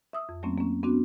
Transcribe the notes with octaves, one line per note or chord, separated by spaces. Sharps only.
E5 D#6 E6
F2
F#3 A3 A#3 C4 C#4
A#3 C#4
B3 C4 D4 F#4